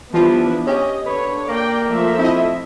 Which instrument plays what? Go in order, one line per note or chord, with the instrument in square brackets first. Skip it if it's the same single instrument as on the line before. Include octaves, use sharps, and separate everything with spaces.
[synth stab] E3 G3 F4 [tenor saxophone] F3 [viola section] B3 D4 E4
[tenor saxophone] C#4 [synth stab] G4 [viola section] D#5
[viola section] D3 C#5 [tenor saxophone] B4
[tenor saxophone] A#3 [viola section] D5 G5
[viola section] F3 A3 E5
[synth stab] C4 D#5 [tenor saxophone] E4